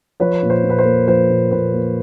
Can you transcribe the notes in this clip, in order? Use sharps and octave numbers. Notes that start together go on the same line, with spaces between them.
F3 B4 C#5
A#2
C5
A#2
B4
C5
A#3
F3 C5
A#2
A#2 B4
A#3